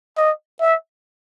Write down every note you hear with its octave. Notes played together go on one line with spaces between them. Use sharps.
D#5
E5